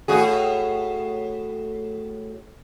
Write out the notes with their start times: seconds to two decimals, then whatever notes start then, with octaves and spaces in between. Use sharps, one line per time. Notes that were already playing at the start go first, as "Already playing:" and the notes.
0.08 A2 F#4 G#4